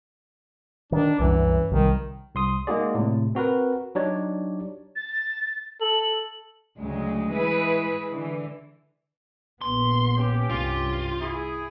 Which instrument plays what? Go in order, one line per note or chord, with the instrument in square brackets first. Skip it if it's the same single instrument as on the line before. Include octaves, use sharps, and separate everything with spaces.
[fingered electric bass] D#3 [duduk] D4
[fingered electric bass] C2 F#2 [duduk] E3
[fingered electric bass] B1 C3 G3 [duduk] D#3
[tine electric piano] C2 C6 D#6
G#3 A#3 D#4 F#4 G#4 D5
A2 C3
C4 F#4 A#4 B4
F#3 D4 D#4 G4 C#5 D5
[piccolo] A6
[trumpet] A4 [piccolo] F#7
[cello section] D2 C#3 F#3 G#3
E3 G#3 E4 G#4 B4
D3 E3
[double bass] A#1 B3 [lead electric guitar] C6
[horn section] C#4 G4
[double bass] C2 G2 [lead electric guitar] F4
[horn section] E4 G#4